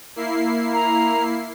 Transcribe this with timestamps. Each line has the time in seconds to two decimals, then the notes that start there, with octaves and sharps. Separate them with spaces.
0.16 A#3 E4 C7
0.74 A#5